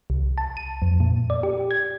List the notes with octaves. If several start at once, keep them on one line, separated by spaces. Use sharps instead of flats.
C2
A5
D#7
F2
A#2
D5
G4
G#6